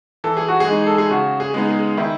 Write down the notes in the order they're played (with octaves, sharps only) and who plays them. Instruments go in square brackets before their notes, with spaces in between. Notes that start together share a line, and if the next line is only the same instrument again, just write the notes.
[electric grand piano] E3 [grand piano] A4
[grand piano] G#4
F#4
G#4
[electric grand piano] G#3 D#4
[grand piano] A4
G#4
[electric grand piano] C#3 [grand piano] F#4
[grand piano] G#4
[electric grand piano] G#3 B3 D#4
[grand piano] G#4
[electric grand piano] D#3 [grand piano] E4